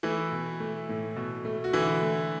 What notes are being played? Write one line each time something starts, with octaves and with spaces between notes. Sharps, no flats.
E3 A3 E4
B2
A3
A2
B2
A3
F#4
D3 E3 E4
A3